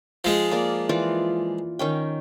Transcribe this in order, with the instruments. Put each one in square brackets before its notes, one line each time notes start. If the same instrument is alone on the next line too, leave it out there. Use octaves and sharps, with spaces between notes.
[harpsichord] F3 G#3
[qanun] A#3 D5
E3 F4 D5
D#3 C#4 G5